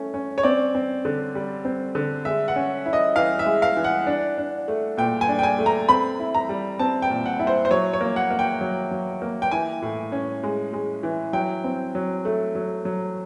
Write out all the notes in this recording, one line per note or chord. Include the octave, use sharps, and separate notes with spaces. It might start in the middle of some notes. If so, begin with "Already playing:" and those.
Already playing: A3 C#4 E4
C#4
C#5
C4 D5
C4
D3
G3
C4
D3
G#3 E5
F#5
C#4
E4
D#5
E3 F5
E5
G#3
F5
E3
F#5
D4
D4
A3
A#2 G5
G#5
D4
G5
G#5
A3
A#5
C4 B5
E4
A#5
G3
C4 A5
G5
A#2
F#5
E4
C5
C5
F#3 C#5
C#5
A#3
F#5
A#3
G5
F#3
F#3
A#3
G5
E3 G#5
A2
C#4
G#3
G#3
E3
F#3 G5
C4
F#3
A3
F#3
F#3